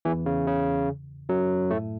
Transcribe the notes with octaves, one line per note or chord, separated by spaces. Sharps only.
E2 E3
C#3
C#3
F#2 F#3
A2 A3